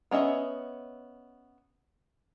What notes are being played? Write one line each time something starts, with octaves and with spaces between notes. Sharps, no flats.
B3 C#4 D#5 E5